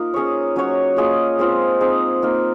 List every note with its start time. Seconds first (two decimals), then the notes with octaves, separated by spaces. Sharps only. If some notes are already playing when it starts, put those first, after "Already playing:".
Already playing: A#3 D#4 F4 A#4
0.14 C#4 G#4 C#5
0.56 F#3 C#4 F#4 C#5
0.96 A#3 F4 G#4 D#5
1.39 G#3 C4 F4
1.81 C4 D#4 G#4
2.22 A#3 D#4 A#4